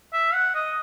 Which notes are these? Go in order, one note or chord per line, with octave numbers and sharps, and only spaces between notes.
E5
F#5
D#5